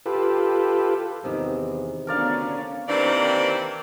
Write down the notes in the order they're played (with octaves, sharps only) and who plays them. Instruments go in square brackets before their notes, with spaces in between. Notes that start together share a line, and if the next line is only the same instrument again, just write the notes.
[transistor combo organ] F4 G4 A4 B4
[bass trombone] E2 [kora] C3 D#3
[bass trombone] D2 [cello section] B3 C#4 D4 [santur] A#4 D5 F5
[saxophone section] C3 D#3 E3 A#3 C4 D4